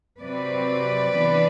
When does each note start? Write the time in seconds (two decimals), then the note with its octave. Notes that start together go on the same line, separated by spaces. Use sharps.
0.20 C3 F#3 C4 B4 D5
1.15 E3 B3 D4